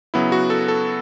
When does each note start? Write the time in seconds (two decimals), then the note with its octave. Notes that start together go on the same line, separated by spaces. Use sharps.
0.14 C#3 F#3 B3 E4
0.32 F#4
0.50 A4
0.68 A4